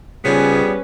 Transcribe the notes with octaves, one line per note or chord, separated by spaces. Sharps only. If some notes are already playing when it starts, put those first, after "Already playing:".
C#3 F3 G3 B3 C#4 G#4 B4